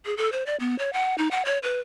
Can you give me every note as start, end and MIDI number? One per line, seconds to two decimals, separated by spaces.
0.05 0.17 68
0.17 0.31 69
0.32 0.44 72
0.46 0.56 74
0.60 0.78 59
0.79 0.93 73
0.93 1.16 78
1.18 1.29 63
1.31 1.43 78
1.45 1.58 73
1.63 1.80 71